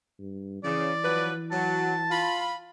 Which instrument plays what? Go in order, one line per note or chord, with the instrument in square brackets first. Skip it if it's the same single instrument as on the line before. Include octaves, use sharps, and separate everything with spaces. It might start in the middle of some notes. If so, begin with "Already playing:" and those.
[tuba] G2
[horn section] C#3 [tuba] E3 [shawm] D5
[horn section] F3 F#3 B4
[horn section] F#3 [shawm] A5
[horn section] F4 B5